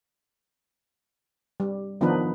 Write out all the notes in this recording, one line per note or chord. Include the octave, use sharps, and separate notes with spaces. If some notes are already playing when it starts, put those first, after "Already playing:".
G3
D#3 F3 B3 D4 D#4 B4